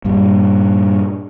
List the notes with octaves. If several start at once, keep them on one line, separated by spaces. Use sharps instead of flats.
G2 A#2 G3